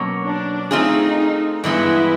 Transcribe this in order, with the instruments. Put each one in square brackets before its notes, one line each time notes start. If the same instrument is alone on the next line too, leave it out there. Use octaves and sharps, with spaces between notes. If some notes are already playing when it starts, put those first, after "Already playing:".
Already playing: [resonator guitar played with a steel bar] B2 F#3 A#3 C#4
[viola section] D4
[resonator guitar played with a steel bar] A3 C4 F4 G#4 [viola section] D#4
[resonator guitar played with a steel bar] G2 E3 G#3 B3 [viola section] E4